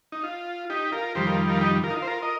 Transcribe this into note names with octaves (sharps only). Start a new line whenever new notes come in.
D#4
F4
D#4 G4
F4 A#4
F2 D#3 G3 G4 C5
F4 A#4
F4 A#4
D#4 G4
F4 A#4
D#4
F4
C5
F4 A#4
A#4 D#5